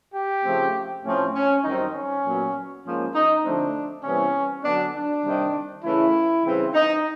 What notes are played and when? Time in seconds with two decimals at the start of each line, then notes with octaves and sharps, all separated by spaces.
0.14 G4
0.44 C#3 F3 A3 C4
1.04 A2 F3 A3 C4 C#4
1.34 C#4
1.64 F#2 D#3 G3 C4 D#4
1.94 C#4
2.24 A#2 F#3 B3
2.84 G#2 F3 A#3 C#4
3.14 D#4
3.44 D3 F3 A3 C4 D4
4.04 C3 E3 G3 B3 C#4
4.64 D3 F#3 B3 D4
4.94 D4
5.25 C3 D#3 G3
5.84 C#3 E3 A3 C#4 E4
6.44 C#3 E3 G3 C4
6.74 D#4